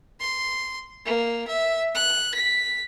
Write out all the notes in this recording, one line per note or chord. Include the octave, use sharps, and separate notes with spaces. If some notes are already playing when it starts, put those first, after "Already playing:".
C6
A#3
E5
F#6
B6